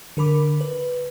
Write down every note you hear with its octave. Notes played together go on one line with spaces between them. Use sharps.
D3 A#4 B5 D6
B4